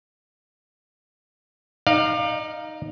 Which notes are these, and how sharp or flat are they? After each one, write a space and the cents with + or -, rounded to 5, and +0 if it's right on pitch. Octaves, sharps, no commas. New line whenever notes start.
D#4 +0 D5 +35 F5 +0